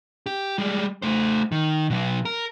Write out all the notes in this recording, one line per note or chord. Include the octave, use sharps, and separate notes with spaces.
G4
G3 G#3
A3 C5
D#3
B2 F#3
A#4